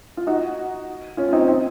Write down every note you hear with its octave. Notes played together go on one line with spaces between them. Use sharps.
F4
D#4 F#4
C#4 F4
F4
C4 D#4
C4 D#4